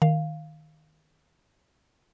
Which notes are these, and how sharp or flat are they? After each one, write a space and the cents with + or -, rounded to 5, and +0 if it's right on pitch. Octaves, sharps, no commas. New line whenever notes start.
D#3 -5 F5 +0